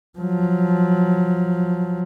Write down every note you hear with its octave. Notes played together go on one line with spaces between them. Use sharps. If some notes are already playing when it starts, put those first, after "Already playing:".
F3 F#3